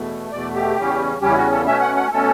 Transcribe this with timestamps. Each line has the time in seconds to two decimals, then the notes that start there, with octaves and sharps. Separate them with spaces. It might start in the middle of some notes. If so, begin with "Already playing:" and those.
Already playing: E2 B2 A3
0.32 E2 B2 A3 D5
0.54 G4
0.77 E2 C#3 G3 C#4
1.22 E2 C#3 G3 C#4 G4
1.30 E4
1.37 F#4
1.52 A4
1.67 B2 A3 C#4 E5
1.81 F#5
1.96 F#5
2.11 B2 A3 C#4 A4